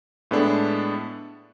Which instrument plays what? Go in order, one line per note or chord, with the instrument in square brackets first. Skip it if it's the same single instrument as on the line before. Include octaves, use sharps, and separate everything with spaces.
[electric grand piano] A2 G#3 B3 D4 A4